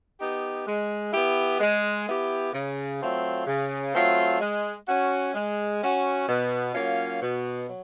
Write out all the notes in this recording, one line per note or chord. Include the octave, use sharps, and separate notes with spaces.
B3 D#4 G4
G#3
B3 E4 G4
G#3
B3 E4 G4
C#3
F#3 A3 C4 F4
C#3
F#3 A3 C4 F4
G#3
C#4 F#4
G#3
C#4 F#4
B2
F#3 A#3 C#4 F4
B2
F#3